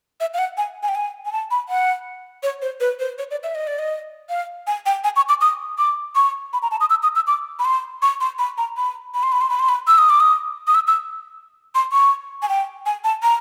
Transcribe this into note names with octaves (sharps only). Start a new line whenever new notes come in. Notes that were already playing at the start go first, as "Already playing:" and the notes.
E5
F5
F#5
G#5
G#5
G5
G#5
G#5
A5
B5
F#5
C#5
C5
B4
C5
C#5
D5
E5
D#5
D5
D#5
F5
G#5
G5
G#5
C#6
D6
D#6
D6
C#6
B5
A#5
A5
D#6
E6
D#6
E6
D6
B5
C6
C#6
C6
B5
A#5
B5
B5
C6
B5
C6
B5
C6
B5
E6
D#6
D6
D#6
D#6
E6
E6
C6
C#6
G#5
G5
G#5
A5
A#5